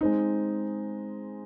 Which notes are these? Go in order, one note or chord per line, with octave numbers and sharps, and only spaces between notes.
G#3 C4 D#4